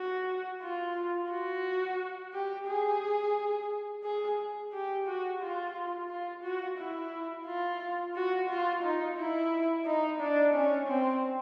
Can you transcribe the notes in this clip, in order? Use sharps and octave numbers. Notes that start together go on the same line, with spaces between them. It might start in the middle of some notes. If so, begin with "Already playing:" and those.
Already playing: F#4
F4
F#4
G4
G#4
G#4
G4
F#4
F4
F4
F#4
E4
F4
F#4
F4
D#4
E4
D#4
D4
C#4
C4